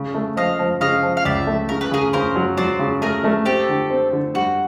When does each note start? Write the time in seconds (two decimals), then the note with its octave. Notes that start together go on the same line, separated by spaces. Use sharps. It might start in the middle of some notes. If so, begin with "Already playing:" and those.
Already playing: C#3
0.14 A3
0.37 F3 D#5 F5
0.59 F3
0.81 C#3 D#5 F5
1.03 F3
1.17 F5
1.25 C#2 D5 E5
1.47 A3
1.69 C#3 A#4
1.81 B4
1.91 C#3 G#4 A#4
2.13 C#3 A#4 C5
2.36 F#3
2.57 F#3 C5 D5
2.79 C#3
3.02 A3 G#4 A#4
3.24 A3
3.45 C4 G4 A4
3.68 D3
3.90 C4
4.13 D3
4.34 G3 F#4